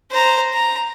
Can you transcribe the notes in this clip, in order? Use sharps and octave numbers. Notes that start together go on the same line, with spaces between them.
C5 A#5
A#5